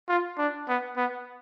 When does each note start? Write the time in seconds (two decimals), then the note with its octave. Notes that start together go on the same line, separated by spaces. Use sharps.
0.09 F4
0.38 D4
0.68 B3
0.97 B3